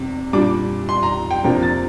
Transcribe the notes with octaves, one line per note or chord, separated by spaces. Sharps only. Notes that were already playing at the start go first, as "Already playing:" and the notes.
Already playing: C3 D6
A#2 G3 D4 D6
C6
A#5
G5
C3 F3 A#3 D4 A#5
A6